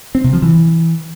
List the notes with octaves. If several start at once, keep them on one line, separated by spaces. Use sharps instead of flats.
C4
C3
F3
E3